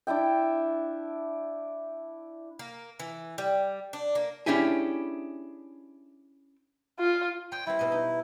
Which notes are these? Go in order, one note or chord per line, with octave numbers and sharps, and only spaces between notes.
D4 E4 E5 G5
A#3
E3
G3
D4
A#3
C#4 D4 E4 G4 G#4
F4
C#5 D#5 G5 C6
G3 C4 E4
B2 D#5
D#4